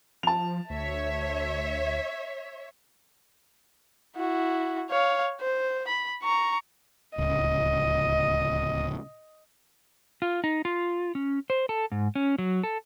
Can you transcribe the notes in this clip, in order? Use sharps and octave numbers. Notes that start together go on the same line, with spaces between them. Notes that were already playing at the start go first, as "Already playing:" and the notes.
F3 A5 F7
D2 C#5 E5
E4 F#4
C#5 F5
C5
B5
A#5 C#6
D1 C#2 D#5
F4
D#4
F4
C#4
C5
A4
G#2
C#4
F#3
A4